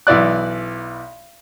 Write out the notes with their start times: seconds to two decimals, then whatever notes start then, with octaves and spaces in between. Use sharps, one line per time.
0.07 B1 E3 E4 D5 F#6